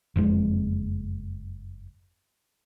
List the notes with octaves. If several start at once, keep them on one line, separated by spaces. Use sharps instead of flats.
F#1 F2 G#3